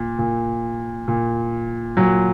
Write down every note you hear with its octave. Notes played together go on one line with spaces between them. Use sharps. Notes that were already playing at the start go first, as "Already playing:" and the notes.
Already playing: A#2
A#2
A#2
A#2 F#3